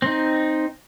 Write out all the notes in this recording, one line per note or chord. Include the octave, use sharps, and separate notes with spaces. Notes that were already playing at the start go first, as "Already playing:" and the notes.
C4 D#4